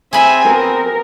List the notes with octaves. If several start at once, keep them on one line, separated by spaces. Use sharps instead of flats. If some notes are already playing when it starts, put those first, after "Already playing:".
C4 G#4 E5 G#5 B5
B3 A#4